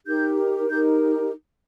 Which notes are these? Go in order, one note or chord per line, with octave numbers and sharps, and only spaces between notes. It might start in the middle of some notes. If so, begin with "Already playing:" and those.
D#4 G4 A#4 G6
D#4 G4 A#4 G6